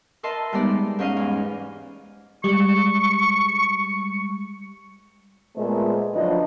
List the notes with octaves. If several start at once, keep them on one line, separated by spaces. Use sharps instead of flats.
A#4 B4 D#5 E5 A5 C6
G3 G#3 B3 D#4 D5
G#2 C#4 D#5 F5 D#6
E2
G3 G#3 C#6
A#2 G#3 A3 B3 C5 D#5
D2 F3 F#3 D4 B4 D#5